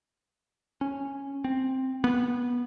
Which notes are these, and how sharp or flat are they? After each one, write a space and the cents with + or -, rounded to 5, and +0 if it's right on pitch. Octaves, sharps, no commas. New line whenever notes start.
C#4 -5
C4 +5
B3 -15